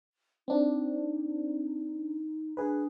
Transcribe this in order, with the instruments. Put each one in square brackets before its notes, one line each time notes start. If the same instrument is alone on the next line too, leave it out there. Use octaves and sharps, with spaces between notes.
[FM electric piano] C4 D4 [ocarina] D#4
[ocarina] D4 [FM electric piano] G#4 B4